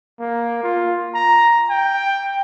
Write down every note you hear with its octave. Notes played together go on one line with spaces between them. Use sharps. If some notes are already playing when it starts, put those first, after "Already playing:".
A#3
F4
A#5
G5